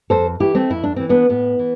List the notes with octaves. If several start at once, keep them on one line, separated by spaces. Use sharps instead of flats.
F2 A4 C5
E3 E4 G4
A3 C4
F2 E4
D4
E3 C4
B3 D4
A2 B3
E3